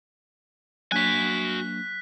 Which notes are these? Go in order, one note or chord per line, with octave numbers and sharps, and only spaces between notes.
F#3 A#3 D4 F#4 G#5 F#6 B6